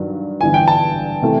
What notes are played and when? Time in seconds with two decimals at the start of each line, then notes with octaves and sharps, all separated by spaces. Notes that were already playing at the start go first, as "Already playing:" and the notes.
Already playing: G2 D#3 F#3
0.41 G1 G2 E3 G#5
0.54 G5
0.68 A5
1.22 C3 E3 A3